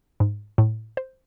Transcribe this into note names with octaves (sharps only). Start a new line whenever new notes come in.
G#2
A2
C5